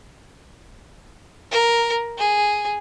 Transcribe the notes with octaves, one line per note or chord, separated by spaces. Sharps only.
A#4
G#4